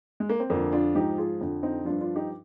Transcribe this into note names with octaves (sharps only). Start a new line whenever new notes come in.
G#3
A#3
C4
F2 D3 F3 A#3 D4
D4 F4
G#2 F3 D#4 G4
F4 G#4
F2 D3 F3
C4 D#4
G2 F3 D4 F4
D4 F4
D#4 G4